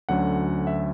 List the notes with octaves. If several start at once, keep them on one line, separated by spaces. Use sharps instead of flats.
D2 D3 F#3 C#4 F#5
E5